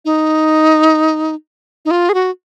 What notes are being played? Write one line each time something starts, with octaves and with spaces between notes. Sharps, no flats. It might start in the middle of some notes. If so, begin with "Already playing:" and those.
D#4
D#4
F4
G#4
F#4